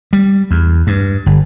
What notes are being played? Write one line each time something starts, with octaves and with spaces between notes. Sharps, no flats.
G3
E2
G2
G1